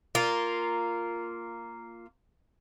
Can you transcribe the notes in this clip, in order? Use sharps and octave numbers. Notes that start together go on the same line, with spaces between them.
A#3 F4